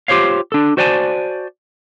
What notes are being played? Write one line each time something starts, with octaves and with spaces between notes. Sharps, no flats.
F4 G4 C5 C#5 F5
D4 A4
F#4 C5 D5 F#5 G#5 A5